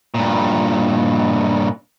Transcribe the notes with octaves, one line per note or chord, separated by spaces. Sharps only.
G2 A#2